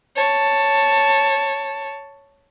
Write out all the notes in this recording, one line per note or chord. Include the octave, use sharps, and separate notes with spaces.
C#5 A5